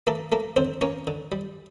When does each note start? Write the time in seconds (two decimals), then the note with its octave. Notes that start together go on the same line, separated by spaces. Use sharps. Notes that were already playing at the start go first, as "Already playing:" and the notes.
0.07 A3 A#3 A4
0.32 A3 A#3 A4
0.56 D3 C4 C5
0.81 A#3 C#4 C#5
1.07 D3
1.32 G3